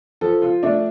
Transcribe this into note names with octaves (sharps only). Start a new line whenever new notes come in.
F3 A4
F4
A3 D4